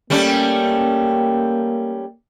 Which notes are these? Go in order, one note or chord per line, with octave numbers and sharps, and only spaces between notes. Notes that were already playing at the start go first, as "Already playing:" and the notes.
G3 A3 A#3 C#4